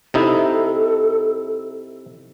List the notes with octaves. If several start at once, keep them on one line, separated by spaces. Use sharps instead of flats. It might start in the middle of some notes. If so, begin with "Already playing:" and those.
C3 D#4 E4 A4